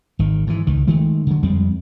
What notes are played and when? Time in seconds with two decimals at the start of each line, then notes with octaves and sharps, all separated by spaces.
0.19 G#1 D#3
0.47 G#2 E3
0.67 C#2 D#3
0.87 D#3 G#3 A3
1.27 D3 F#3
1.43 F2 G3 G#3 C4